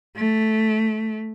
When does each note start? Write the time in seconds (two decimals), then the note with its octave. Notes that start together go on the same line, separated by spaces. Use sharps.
0.17 A3